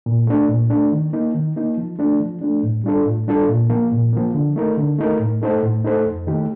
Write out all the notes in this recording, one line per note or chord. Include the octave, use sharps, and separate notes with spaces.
A#2
A3 D4
A#2
A3 D4
D#3
A#3 D#4
D#3
A#3 D#4
F3
A3 D4
F3
A3 D4
A2
G3 D4 F4 A4
A2
G3 D4 F4 A4
A#2
F3 A#3
A#2
F3 A#3
D3
A3 D#4 A#4
D3
A3 D#4 A#4
A2
A3 D#4 A4 C5
A2
A3 D#4 A4 C5
F2
D#3 A3 D#4 G4